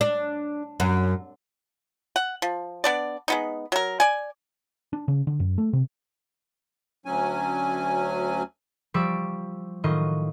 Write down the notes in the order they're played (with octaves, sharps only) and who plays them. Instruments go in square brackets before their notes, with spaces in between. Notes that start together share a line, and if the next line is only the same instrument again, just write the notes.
[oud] D4
F#2
[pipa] F#5
F3
B3 D4 D5
G#3 B3 D#4
F#3 A#4
D5 G#5
[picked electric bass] D4
C#3
D3
F#2
A3
C3
[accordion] D2 F#3 C#4 G#5
[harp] F3 G3 C#6 E6 D7
A2 D#3 F#3 F4 D#5 C#6